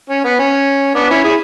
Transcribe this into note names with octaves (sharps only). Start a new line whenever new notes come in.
C#4
B3
C#4
B3 D4
C#4 E4
E4 G#4